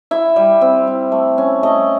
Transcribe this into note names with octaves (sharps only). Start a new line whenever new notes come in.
E4 E5
G3
C4
E4
A3
C#4
A3 D#5